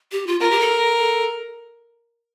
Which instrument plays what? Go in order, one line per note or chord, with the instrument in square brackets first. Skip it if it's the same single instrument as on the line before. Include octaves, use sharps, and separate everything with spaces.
[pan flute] G4
F4
[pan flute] F4 [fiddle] A#4
[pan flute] G4
A4
A4